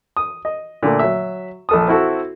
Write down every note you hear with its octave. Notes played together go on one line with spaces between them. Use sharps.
D#6
D#5
A#2 D3 A3
F#3 E5
A#1 A4 D#6
C4 E4 F#4 A4